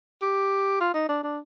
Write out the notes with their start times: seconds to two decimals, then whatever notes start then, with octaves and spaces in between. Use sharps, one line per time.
0.22 G4
0.80 F4
0.94 D#4
1.09 D4
1.23 D4